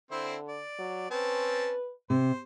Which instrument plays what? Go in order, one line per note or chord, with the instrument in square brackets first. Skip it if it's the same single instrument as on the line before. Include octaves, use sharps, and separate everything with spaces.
[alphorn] D3 [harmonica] C4 E4 C5
[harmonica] D5
[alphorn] F#3
[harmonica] C4 C#4 A5 [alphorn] B4
[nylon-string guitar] C3 [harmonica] C5